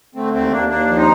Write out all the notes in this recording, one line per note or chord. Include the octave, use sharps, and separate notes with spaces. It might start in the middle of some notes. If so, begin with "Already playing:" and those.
D3 A3 C4
D#2 A3 C4
D#2 A#3 D4
D#2 A#3 D4
F3
C4 D#4